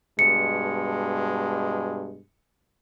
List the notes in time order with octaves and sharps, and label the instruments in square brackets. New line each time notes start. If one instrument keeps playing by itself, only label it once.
[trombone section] G2 B2 G#3 [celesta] C#7